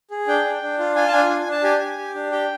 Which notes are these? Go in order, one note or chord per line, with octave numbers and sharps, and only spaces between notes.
G#4
D4 G5
D4
D4
F4
F4 G#5
A5
D4 G#5
D4
D4 A5
G4 G#5
G4
G4
D4
G4 G5